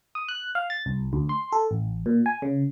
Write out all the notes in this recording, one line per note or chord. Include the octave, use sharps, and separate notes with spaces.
D#6
F#6
F5
A6
C2
D2
C6
A4
A1
A#2
G#5
C#3